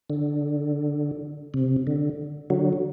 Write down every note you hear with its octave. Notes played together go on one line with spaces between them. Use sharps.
D3
C3
D3
D3 F#3